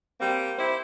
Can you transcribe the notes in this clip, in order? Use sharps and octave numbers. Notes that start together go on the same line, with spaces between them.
G3 A#3 C4
E4 G4 C5